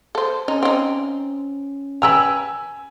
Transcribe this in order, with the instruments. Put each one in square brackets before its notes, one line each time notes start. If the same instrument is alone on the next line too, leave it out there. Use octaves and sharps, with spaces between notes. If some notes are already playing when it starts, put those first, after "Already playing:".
[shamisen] A4 C5
[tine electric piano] C#4 [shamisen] D#4
[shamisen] C4 D#4
[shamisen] B4 G5 A#5 [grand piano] G#5 E6